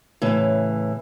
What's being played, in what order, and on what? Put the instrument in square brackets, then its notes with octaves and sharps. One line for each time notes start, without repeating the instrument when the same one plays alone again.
[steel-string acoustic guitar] A2 C#3 E3